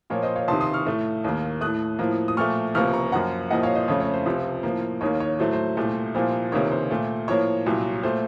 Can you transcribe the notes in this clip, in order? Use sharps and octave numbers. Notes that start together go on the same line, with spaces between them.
A#2 F3 A#3 C#5
C5 D#5
C#5 F5
C#2 C3 D#3 A5 C6
C6 D#6
C#6 F6
A2 A3
D#2 D#3 A#3
A2 A3 D#6 F#6
A2 F3 A#3
D#6
A#2 F3 A3 C#6 F6
C#2 C3 F3 A#3 C#6 F6
A#5 C#6
F#2 F3 A#3 F#5 A#5
C2 A#2 F3 A#3 D#5 F#5
C#5 F5
C5 D#5
F2 C#3 A3 C#5
C#5
C5
C#2 C3 F3
A2 F3 A#3
D#2 D#3 A#3 C#5
C#5
A2 F#3 A3 C5
C5
C2 A#2 A3
C2 A#2 F3 A#3 C5
C#2 C3 D#3 A#3 C#5
C5
A#2 A3
A2 F3 A#3 C#5
C2 A#2 F#3
A#2 A3 C5